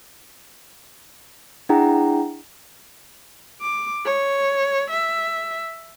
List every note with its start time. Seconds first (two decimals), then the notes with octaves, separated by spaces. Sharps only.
1.69 D4 E4 G#4 F#5 G5 A#5
3.61 D6
4.05 C#5
4.91 E5